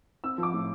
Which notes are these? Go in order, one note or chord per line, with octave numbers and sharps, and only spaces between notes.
C4 E6
F3
D6
A2